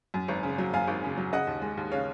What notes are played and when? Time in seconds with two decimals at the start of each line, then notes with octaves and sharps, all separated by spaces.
0.14 F#2
0.28 G#1
0.43 C#3
0.58 F#3
0.73 F#2 F5 G#5
0.88 G#1
1.03 C#3
1.17 F#3
1.33 C#3 D#5 F#5
1.47 D#2
1.62 G#3
1.77 D#2
1.92 C#3 C#5 F5